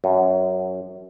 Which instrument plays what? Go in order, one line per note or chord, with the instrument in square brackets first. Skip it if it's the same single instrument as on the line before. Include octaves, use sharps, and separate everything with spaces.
[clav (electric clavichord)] F#2